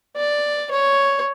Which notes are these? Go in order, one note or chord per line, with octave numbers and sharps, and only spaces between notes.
D5
C#5